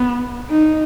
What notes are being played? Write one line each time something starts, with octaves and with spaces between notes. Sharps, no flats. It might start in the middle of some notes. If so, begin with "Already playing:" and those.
Already playing: B3
D#4